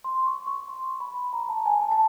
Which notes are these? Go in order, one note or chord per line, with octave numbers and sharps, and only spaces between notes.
C6
C#6
C#6
C6
B5
A#5
A5
G#5
A5
A5